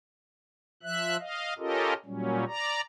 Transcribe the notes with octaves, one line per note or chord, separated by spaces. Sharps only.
F3 E5 F#6
D#5 F5
C#4 F4 G4 A4 A#4 D#5
A#2 F#3 G3 C#4
D5 A#5